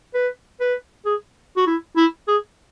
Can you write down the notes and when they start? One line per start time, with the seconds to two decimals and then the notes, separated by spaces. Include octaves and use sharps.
0.14 B4
0.60 B4
1.05 G#4
1.57 F#4
1.67 E4
1.97 E4
2.28 G#4